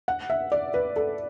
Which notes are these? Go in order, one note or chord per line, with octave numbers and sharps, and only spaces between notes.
F#5
E5
D5
B4
A4